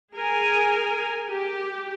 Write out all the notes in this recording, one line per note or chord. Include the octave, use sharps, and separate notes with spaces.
G#4 A#4 G#5
G4